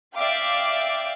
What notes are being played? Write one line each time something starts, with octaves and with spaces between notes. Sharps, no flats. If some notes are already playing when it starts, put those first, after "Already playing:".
D5 E5 F5 G5 D6